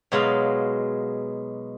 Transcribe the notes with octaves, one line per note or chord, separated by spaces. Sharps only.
B2 F#3 G#3 D#4 F4 F5